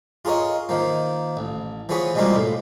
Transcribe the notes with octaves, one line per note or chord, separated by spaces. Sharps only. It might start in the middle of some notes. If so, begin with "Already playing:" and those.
F4 G#4 A#4 C#5 D#5
D#3 F3 A#3
A1
E3 F3 B3 G#4 C#5
B2 G3 G#3 A#3 C4 F4
A2